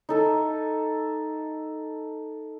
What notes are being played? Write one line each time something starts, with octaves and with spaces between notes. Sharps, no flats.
D#4 A4 E5